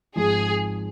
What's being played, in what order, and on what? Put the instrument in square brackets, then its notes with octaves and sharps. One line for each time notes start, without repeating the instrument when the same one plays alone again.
[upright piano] G#1 G#2 F3 G#3 [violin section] G#4